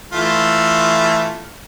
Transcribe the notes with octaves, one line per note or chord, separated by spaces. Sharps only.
E3 A3 F4